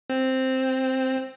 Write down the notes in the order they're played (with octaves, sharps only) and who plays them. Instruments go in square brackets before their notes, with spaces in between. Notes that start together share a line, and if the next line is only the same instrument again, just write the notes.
[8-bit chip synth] C4